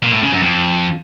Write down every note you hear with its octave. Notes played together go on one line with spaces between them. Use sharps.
A#2
A2
C#3
F#2
F2